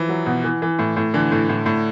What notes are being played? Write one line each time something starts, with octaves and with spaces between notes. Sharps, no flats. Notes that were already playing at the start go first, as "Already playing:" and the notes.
Already playing: E3 F3
F#3
B2
E3
E3
A2
A2
D3 E3
A2
A2
A2